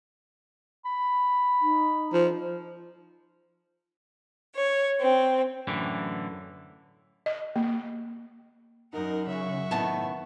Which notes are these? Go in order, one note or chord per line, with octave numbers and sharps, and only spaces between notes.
B5
D#4
F3
C#5
C4
F#2 A2 D3 E3
D#5
A#3
F#2 D#4 A#4 F#5
C#3 E5 C#6
A2 D#3 B3 A5